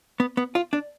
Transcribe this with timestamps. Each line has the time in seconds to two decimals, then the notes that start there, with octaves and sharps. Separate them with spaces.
0.20 B3
0.37 B3
0.55 F4
0.73 D4